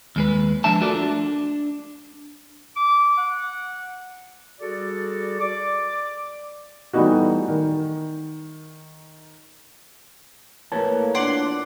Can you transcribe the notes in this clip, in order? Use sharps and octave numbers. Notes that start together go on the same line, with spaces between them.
D#2 G#3 B4
F3 G#3 D4 E5 A5
A3 F4 F#4 A4 A#4 D5
D4
D6
F#5
G3 F#4 G#4 A4 D5
D5 D6
E3 G3 A3 B3 D#4 F#4
D#3 A#4
A3 A#3 E4 G#4 A#4 B4 C#5 A5
E2 A#2 D4 D5 F#5 C6